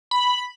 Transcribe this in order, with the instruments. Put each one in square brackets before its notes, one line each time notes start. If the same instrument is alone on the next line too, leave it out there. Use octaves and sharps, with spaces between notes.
[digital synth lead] B5